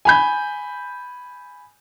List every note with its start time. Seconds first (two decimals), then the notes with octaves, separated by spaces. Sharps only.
0.05 G#5 B5 G6